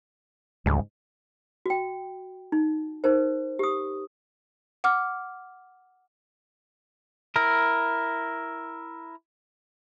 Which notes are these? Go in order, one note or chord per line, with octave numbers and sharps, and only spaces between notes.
D2 G#2 C#3 G3
F#4 G5
D#4
D#4 A#4 C5
G4 D#6
F#5 D6 F6
E4 A#4